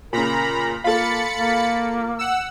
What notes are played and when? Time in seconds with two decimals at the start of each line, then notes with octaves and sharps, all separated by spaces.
0.13 A#2 C#3 A#4 A#5 B5
0.84 A#3 F4 A4 B5 A6 C#7
1.38 A#3
2.19 F#5 E6